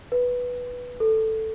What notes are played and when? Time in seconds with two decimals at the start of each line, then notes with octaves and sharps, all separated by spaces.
0.12 B4
1.00 A4